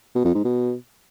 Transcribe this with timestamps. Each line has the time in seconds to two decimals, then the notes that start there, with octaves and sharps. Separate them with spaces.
0.15 B2
0.25 F2
0.35 G#2
0.44 B2